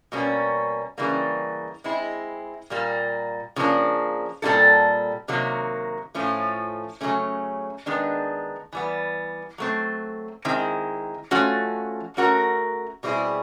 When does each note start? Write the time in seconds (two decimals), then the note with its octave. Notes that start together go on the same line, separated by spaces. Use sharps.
0.12 B2 G3 A#3 C#4
0.98 C#3 E3 G3 A#3
1.84 G#3 C4 E4
2.70 A#2 G3 A#3
3.56 C#3 F3 A#3 D4
4.42 A#2 G3 C4 E4 A4
5.28 C3 D#3 F#3 A#3
6.15 A2 F3 A3 C#4 F4
7.01 C#3 F#3 A3 C#4
7.86 D#3 G#3 B3 D4
8.72 E3 G3 B3
9.58 F#3 A3 C4
10.45 D#3 G#3 C4 E4
11.31 F3 A3 C#4 F#4
12.17 A3 C#4 F#4 A#4
13.03 B2 G3 C4 E4 G#4